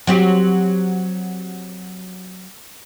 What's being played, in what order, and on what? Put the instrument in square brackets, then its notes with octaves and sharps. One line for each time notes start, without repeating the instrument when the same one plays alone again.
[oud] F#3 C4 G4